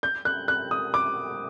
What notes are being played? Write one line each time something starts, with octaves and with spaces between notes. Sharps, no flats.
G6
F#6
F#6
D#6
D6